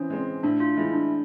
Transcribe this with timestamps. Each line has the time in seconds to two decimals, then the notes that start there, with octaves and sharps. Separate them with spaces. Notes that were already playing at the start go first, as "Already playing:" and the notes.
Already playing: E3 C4 C#4
0.10 G#3 C4
0.43 A2 D4
0.60 F4
0.76 E3 G#3 E4
0.94 D4